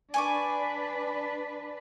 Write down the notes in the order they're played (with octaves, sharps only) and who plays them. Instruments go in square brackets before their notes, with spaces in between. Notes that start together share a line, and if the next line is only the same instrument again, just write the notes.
[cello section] D4 B4 [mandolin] G#5 C#6 D6